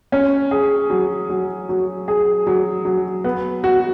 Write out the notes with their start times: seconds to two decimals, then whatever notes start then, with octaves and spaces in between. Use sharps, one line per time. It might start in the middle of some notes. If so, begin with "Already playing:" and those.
0.12 C#4
0.51 G#4
0.90 F#3
1.29 F#3
1.69 F#3
2.08 G#4
2.47 F#3
2.85 F#3
3.24 B3
3.64 F#4